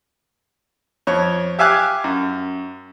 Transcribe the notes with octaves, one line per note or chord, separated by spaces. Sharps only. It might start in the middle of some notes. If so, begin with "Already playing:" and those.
F2 C#5
G4 E5 F5 G#5 D6 F#6
F#2